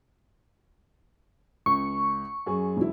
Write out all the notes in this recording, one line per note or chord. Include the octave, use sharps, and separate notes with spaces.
C#2 C#6
F#2 G#4
E1 E4